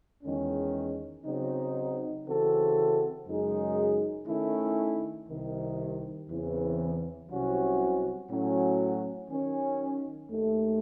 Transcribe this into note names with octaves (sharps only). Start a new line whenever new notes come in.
E2 D#3 G#3 C#4
C#3 F#3 C4 D#4
C#3 E3 C4 F#4 A4
F#2 C#3 G#3 D#4 G#4
D#3 A3 C#4 E4
C2 C3 D#3
E2 C#3 E3 C4
C2 C3 F#3 C#4 F#4
A2 F#3 C#4 F#4
D#3 F#3 C#4
D#2 D#3 A3